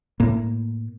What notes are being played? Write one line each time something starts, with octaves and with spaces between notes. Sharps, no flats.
A2 A#3